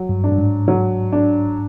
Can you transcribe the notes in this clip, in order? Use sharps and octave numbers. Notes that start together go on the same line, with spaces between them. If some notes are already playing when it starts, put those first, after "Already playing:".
Already playing: F#3
G2
D4
G2
G#2
F#3
D4